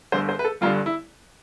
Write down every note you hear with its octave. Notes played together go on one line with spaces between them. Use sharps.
G1 G2 D3 C5
C5
B4
A4
G1 G2 D3 F4
E4